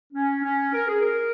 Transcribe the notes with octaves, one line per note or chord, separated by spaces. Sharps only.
C#4
C#4
A#4
G#4
A#4